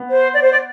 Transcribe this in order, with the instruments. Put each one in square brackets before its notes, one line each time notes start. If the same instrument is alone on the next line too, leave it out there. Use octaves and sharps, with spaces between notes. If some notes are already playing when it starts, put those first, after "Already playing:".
Already playing: [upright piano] B3
[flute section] C5
D5
C5
D5